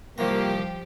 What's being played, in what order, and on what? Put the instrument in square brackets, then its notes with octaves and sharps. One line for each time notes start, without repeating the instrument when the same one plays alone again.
[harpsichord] C2 D#3 A#5 [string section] F3 G4 [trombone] A#3